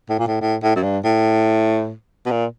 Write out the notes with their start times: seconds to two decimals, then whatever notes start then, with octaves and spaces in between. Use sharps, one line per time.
0.09 A2
0.19 A#2
0.27 A2
0.41 A2
0.63 A2
0.76 F#2
0.83 G2
1.05 A2
2.26 B2
2.31 A#2